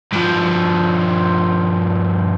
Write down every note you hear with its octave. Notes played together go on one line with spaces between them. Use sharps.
G2 F3